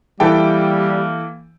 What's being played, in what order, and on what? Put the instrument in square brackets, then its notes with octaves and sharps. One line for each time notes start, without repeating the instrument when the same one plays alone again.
[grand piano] E3 A4 G5 [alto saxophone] G3 [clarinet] A#3 [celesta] E5 A5 B5